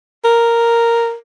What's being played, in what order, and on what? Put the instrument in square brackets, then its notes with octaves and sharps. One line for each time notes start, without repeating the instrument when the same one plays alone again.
[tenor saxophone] A#4